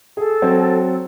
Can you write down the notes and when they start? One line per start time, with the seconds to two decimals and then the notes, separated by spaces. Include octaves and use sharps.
0.17 G#4 A4
0.42 F#3 C4